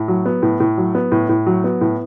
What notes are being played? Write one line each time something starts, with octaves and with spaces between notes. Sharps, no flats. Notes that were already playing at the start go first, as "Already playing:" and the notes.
Already playing: A2
F#3
B3
A2
A2
F#3
B3
A2
A2
F#3
B3
A2